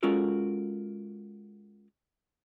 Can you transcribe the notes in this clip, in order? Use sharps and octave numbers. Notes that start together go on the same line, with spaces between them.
G#3 C#4 F4 F#4 A4 A#4